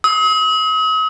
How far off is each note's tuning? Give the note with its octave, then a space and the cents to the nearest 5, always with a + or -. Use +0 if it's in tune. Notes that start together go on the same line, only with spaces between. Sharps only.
D#6 +45